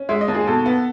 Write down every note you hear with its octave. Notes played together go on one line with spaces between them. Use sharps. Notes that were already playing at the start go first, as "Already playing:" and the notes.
Already playing: C#4
G#3 E5
D#5
D#2
G#4
B2 A4
B3